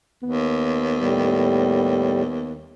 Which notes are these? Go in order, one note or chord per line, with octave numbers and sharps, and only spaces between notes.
D#2 B3
A2 G3